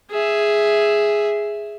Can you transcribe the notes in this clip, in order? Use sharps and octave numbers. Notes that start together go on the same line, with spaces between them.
G#4 E5